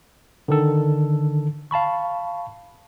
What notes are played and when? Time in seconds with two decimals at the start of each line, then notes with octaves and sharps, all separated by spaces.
0.48 D3 D#3 A4
1.71 F5 A5 B5 C#6